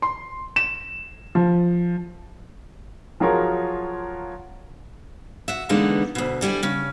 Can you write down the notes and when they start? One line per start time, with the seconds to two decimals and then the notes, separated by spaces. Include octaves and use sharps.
0.02 C6
0.56 E7
1.35 F3
3.20 F3 F#3 F4 G#4 A#4 C#5
5.48 F#4 E5
5.69 D3 E3 G#3 A#3 B3 D#4
6.15 D2 B2
6.41 D3 G3 E4 G#5
6.63 C#3 C#4